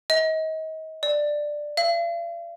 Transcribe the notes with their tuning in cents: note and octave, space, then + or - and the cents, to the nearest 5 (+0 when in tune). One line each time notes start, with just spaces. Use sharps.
D#5 +30
D5 +10
F5 -45